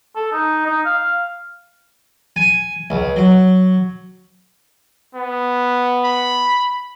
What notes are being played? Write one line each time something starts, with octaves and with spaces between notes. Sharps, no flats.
A4
D#4
D#4
F5
G#5
C#2
F#3
B3
B5